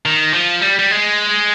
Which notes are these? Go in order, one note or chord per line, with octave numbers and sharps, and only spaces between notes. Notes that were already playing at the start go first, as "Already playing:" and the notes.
D#3
F3
G3
G3
G#3